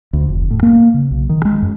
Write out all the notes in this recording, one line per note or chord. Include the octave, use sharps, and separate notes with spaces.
D2
F1
A2
A#3
C#3
B1
D#3
G#3
F#2